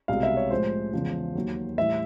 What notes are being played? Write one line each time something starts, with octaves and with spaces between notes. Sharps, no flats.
C2 B2 G#3 F5
E5
C#5
A2 F3 G#3 C5
E2 C#3 F3 G#3
D#2 D#3 F#3
A2 E3 G3 E5